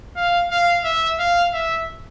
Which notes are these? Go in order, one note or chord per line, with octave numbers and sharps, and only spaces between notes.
F5
F5
E5
F5
E5